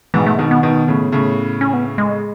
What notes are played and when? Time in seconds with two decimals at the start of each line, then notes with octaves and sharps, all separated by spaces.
0.14 G#2 B2 E3
0.26 A3
0.38 B2 D#3 B3
0.51 B3
0.63 B2 D#3
0.88 A2 C#3
1.12 A2 C#3
1.61 C#4
1.73 B3
1.98 G#3